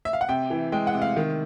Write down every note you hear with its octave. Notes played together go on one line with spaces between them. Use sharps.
E5
F5
F#5
C3 G5
E3
G#3 G5
F#5
C3
F5
D#3